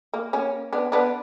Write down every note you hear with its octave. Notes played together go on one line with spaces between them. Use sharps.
A#3
A#3 C#4
B3 D4
B3 D4